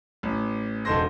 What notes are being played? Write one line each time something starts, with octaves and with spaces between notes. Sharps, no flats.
A1
E1 D#4 A4 C5 C6 A#6